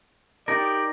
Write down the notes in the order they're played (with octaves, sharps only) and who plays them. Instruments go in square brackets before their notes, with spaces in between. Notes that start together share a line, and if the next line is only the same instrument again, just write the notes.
[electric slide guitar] D#4 A#4 [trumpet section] G4 D5